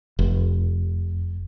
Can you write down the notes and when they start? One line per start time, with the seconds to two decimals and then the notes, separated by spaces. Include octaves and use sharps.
0.19 F1